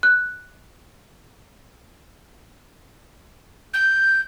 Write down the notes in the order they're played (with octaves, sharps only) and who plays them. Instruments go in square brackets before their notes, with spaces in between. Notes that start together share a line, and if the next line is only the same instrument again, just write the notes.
[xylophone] F#6
[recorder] G6